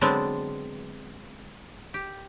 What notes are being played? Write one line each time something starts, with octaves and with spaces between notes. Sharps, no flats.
D3 F#3 G#3 B3 C4 D4
G4